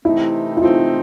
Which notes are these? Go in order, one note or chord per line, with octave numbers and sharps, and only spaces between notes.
C3 E3 A3 C4 D#4 E4
E4
C3 E3 A3 C4 D#4 F4